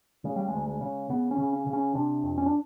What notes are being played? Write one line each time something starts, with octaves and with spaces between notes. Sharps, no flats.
C#3 G#3
G3
D2 G#3
G#3
C#3
C#3 B3
C#4
C#3
C#4
C#3
C#4
C3 D4
F2
C#4
D4